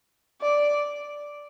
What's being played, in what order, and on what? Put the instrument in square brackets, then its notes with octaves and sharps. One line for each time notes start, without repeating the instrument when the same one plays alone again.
[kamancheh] D5